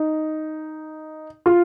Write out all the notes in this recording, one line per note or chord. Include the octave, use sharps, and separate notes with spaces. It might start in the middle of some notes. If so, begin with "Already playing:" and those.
Already playing: D#4
F4